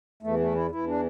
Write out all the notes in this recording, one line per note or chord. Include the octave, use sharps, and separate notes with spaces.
E2 E3 A3
A3
E4
E2 E3 E4
D4